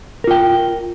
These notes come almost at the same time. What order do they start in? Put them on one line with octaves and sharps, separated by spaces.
A#4 F4 G5